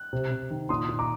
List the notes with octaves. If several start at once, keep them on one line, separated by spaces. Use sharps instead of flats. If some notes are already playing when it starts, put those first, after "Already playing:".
Already playing: F#6
C3
C3
D#3
A#2 C6 D#6
A#2
A#5 D6